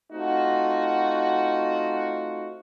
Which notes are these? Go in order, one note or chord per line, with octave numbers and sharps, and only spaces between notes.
A3 C4 D#4 F4 F#4